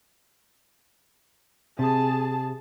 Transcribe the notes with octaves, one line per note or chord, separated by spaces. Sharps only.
C3 G#4 A5